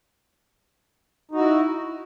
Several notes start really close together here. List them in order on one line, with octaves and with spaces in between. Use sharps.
D#4 F#4 E4